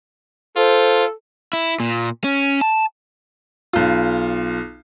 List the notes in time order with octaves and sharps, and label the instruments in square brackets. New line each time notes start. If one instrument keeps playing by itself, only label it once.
[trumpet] F4 [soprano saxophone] A4 [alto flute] C5
[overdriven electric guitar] E4
A#2
C#4
A5
[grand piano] B1 F4